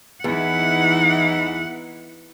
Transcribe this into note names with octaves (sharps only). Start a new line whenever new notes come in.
E2 E3 D#4 E4 F#5